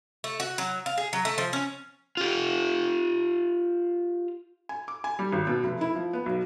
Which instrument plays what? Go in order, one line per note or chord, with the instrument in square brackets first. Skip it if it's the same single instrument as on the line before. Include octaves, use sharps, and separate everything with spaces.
[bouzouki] A3
F#4
F#3
F5
G#4
F#3
A3
F3
C#4
[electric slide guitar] F4 G4
[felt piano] G#5
D6
G#5
G3
G#1
B2
F1
E4
F3
B3
B1